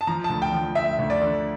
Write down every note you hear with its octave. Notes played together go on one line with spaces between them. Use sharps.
A5
F3 A#5
A5
D2
G5
F3
D2 E5
D2
D5
D3